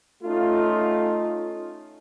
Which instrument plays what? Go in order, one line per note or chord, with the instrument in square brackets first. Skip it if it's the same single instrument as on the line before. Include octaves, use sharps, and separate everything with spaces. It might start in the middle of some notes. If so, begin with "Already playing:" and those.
[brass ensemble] A3 C#4 D#4 F4